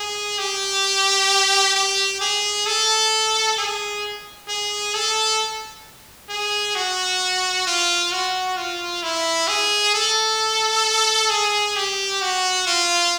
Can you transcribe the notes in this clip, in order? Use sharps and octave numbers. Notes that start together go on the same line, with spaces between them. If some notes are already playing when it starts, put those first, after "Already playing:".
Already playing: G#4
G4
G4
G#4
A4
G#4
G#4
A4
G#4
F#4
F4
F#4
F4
E4
G#4
A4
G#4
G4
F#4
F4